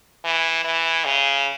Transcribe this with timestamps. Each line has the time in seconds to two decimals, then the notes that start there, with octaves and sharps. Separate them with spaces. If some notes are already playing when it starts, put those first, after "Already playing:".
0.25 E3
0.64 E3
1.05 C#3